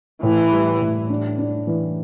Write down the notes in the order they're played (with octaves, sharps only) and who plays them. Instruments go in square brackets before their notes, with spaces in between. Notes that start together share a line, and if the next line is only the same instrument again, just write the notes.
[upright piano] A2 [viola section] E3
[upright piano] G3
A2
D4
D4
E3